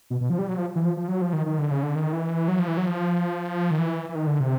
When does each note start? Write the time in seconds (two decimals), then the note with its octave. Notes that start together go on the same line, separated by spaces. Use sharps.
0.10 B2
0.21 B2
0.30 F3
0.39 G3
0.48 F#3
0.58 F3
0.76 E3
0.85 F3
0.97 F3
1.08 F#3
1.22 F3
1.33 D#3
1.46 D#3
1.58 D3
1.71 C#3
1.83 D3
1.95 D#3
2.13 E3
2.48 F#3
2.59 F3
2.68 E3
2.77 F#3
2.87 F3
3.71 D#3
3.79 E3
4.09 E3
4.15 D#3
4.27 D3
4.40 C3